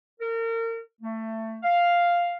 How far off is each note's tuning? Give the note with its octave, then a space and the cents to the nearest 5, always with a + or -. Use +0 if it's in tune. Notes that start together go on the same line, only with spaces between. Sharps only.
A#4 -35
A3 +20
F5 +0